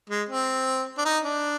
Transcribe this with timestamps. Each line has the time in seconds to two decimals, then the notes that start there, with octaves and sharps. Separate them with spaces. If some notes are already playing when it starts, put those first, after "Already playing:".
0.10 G#3
0.29 C4
0.98 D4
1.05 D#4
1.24 D4